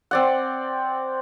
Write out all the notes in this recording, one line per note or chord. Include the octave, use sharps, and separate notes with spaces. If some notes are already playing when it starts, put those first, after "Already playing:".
C4 D5 F#5